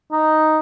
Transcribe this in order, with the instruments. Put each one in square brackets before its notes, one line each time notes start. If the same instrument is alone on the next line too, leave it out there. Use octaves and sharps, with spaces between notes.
[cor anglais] D#4